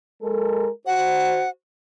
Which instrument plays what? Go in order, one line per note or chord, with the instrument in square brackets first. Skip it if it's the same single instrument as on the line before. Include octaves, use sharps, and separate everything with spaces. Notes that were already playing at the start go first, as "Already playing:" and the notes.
[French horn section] G#3 A4 A#4
[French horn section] F#4 C5 [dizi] F#5